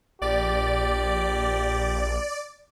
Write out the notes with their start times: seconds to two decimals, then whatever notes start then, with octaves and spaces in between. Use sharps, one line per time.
0.22 A#1 G4 D5